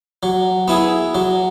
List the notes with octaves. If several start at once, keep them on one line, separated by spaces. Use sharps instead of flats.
F#3
B3 E4 G#4
F#3